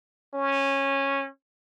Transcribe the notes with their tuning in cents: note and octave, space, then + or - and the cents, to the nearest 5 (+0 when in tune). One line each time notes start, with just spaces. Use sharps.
C#4 -15